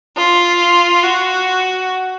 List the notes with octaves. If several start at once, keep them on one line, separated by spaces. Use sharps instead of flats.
F4
F#4